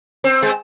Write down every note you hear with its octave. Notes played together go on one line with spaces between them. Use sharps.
C4
G#3